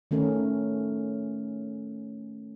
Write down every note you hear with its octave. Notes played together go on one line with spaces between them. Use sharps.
D#3 A3 C#4 A#4